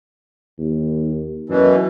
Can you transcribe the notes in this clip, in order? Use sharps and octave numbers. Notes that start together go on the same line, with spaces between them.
D#2
F#2 B2 E3